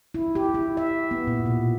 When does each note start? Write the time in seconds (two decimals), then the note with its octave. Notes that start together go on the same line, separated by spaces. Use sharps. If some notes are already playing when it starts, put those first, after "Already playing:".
0.14 E4
0.35 G4
0.54 E4
0.77 E5
1.11 B3
1.27 A#2
1.46 B2